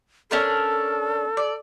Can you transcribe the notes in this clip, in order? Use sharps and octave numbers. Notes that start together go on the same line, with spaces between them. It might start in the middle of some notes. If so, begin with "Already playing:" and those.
C#4 D4 A4 A#4
D5